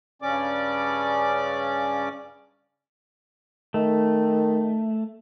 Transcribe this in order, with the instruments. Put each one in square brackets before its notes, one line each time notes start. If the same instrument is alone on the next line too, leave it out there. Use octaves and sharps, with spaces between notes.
[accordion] G2 C#3 C#4 D5 D6
[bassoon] D#3 [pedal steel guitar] A3